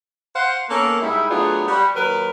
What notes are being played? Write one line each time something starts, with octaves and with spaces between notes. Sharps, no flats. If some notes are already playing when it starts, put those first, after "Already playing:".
C5 F5 F#5
A#3 B3 C#4 A4 A#4
G#2 G3 D#4 E4
F#3 A3 B3 D4 F4 G#4
G3 F#4
D#2 F#3 A#4 B4